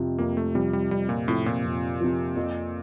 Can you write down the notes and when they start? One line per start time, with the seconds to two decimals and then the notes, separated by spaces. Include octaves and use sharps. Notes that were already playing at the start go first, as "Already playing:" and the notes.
Already playing: F2 C3 F3
0.18 F2 A#3
0.37 A3
0.55 C3 F3 G3
0.73 G3
0.91 F2 G3
1.09 A#2
1.28 A2 C3 F3
1.46 A#2
1.64 F2
2.01 C3 F3
2.36 F2